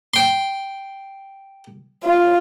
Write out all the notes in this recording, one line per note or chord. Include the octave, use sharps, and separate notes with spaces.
G5 C6
F4